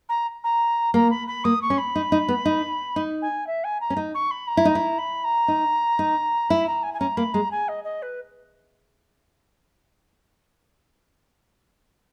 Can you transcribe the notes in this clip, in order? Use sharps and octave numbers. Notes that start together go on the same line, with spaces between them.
A#5
A#5
A#3 A#5
B5
B5
A#3 D#6
C#6
C#4
B5
D#4
D#4
B3
D#4
D#4
G#5
E5
G#5
A#5
C#4
D#4
C#6
B5
A#5
E4
D#4
E4
B5
A#5
D#4
D#4
E4 B5
A#5
G#5
G#5
C#4 A#5
A#3 B5
G#3 A#5
G#5
D#5
D#5
B4